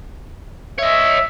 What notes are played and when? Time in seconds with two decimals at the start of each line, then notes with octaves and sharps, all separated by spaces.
0.79 C#5 D#5 E5